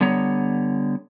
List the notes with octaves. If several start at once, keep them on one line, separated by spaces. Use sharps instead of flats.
D3 G3 B3 C#5 A#5